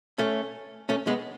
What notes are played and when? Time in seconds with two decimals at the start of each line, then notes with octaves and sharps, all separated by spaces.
0.18 A3 C#4
0.89 A3 C#4
1.07 G#3 B3